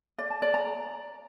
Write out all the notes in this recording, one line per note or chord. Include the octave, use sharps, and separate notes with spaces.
D5
A5
D5
A#5